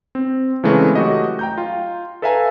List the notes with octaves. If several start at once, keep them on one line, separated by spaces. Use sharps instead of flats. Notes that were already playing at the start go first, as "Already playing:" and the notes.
C4
C#3 E3 G#3 A3 C4
F#3 A3 F#4 G4 D#5
G5 A#5 G6
F4
A4 B4 E5 F5 G#5 A#5